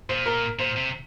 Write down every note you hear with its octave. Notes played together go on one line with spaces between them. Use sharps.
A#2 C5
A#4
A#2 C5
C3